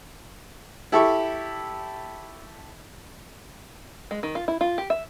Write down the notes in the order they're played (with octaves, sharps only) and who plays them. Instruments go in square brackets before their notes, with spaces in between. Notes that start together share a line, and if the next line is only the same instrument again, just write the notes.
[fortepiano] E4 G4 A4 E5 C#6
[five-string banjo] G#3
D#3
F4
E4
F4
G4
E5